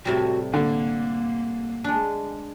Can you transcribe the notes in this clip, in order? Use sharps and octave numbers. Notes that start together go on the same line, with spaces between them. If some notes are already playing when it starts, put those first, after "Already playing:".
A2 C3 G3 F#4
D3 A#3
G#3 D4